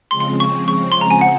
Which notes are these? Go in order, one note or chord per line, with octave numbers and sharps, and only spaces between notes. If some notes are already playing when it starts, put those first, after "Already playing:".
C#3 F3 G#3 C4 C6
C6
C#6
C#6
C6
A#5
G#5
F#5